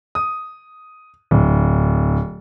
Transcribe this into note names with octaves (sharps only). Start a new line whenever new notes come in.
D#6
D1